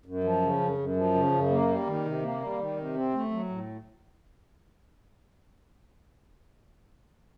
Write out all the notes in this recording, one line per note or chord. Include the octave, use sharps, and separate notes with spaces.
F#2
F3
C#3
F#2
F#2
F3
C#3
F#2
A#3
G3
D#3
C3
A#3
G3
D#3
C3
C4
A3
F#3
A2